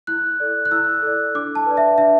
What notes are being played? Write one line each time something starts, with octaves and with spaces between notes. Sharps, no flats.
E4 F#6
A4 D5
F#6
E4 E6
A4 D5
D4 D6
A5
B4 D5
E5
D4 E5